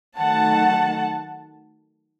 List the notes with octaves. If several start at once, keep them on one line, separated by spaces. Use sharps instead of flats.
D#3 F#3 A3 F#5 A5